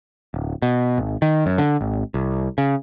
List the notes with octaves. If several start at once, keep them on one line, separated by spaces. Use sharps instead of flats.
D1
B2
G#1
D#3
F#2
D3
G#1
C2
C#3